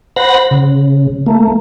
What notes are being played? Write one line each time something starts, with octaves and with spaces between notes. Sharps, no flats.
C5 F#5 B5 A#6
C#3
A3 A#3